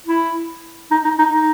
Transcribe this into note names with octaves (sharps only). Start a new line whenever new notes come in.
E4
D#4
D#4
D#4
D#4